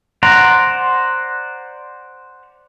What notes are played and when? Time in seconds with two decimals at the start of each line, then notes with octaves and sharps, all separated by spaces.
0.23 C5 D5 F#5 A#5